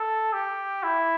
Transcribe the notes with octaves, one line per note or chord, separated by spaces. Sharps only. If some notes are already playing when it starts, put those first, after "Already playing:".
Already playing: A4
G4
E4